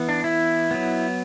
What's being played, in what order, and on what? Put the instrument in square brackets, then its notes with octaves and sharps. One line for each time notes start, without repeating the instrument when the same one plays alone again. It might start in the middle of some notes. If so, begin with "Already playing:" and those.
Already playing: [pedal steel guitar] E3 B3
D4
E4
F#3 B3